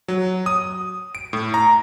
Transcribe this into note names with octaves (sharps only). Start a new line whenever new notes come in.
F#3
D#6
D7
A2
A#5